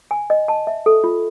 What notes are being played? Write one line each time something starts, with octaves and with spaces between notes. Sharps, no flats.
G#5
D#5
A5
E5
A4
F4